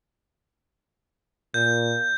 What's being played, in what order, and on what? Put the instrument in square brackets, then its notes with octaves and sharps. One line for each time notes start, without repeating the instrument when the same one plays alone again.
[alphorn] A#2 [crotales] G6